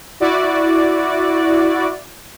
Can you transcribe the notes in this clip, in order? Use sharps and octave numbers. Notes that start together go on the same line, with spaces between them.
E4 F#4 D5